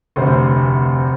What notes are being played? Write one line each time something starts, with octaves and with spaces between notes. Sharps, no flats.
F1 D2 C3 C5